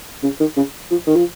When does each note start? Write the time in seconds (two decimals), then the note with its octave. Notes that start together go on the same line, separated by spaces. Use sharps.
0.23 C#3
0.40 D#3
0.57 C#3
0.91 F3
1.07 D#3
1.16 F3